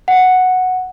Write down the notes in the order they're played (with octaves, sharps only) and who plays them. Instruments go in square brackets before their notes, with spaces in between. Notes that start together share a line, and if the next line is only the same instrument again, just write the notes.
[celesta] F#5